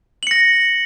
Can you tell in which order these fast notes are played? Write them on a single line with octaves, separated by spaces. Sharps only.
F#7 C#7 A#6